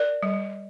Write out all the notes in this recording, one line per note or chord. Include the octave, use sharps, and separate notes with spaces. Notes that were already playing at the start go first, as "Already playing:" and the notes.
Already playing: A#4 D5
G3